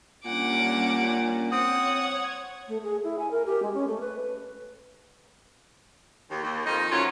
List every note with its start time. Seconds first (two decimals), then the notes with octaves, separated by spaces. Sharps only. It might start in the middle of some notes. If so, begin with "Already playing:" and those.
0.25 A#2 G3 C#4 D4 F#5 D6
1.52 C4 C#5 F#5 D#6 G#6
2.68 A3
2.83 G#4
3.04 E4
3.19 G#5
3.31 A#4
3.46 G4
3.62 G#3
3.74 C#4
3.87 A3
4.01 B4
6.30 D#2
6.43 D#2
6.65 F2 D#3 F3 D#4
6.91 D2 F#3 C#4 E4 F4